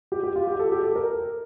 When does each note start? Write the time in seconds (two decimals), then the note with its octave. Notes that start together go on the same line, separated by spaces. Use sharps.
0.12 G4
0.23 G4
0.36 F4
0.47 G4
0.59 A4
0.72 G4
0.83 A4
0.96 A#4